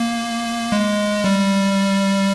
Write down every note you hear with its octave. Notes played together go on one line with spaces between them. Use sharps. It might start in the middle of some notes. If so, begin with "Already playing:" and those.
Already playing: A#3
G#3
G3